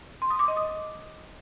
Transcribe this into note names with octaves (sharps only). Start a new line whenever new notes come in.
C6
D#6
D6
D#5
D#6